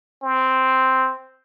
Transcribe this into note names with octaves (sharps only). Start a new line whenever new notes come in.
C4